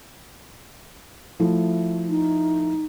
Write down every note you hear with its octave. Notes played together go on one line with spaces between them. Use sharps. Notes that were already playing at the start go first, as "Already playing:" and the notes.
F3 A3 E4
D#4